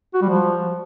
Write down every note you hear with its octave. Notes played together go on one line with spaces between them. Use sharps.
F#4
G3
F3